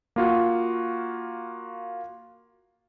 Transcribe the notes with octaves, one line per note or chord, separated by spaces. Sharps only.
A#3 F4 F#4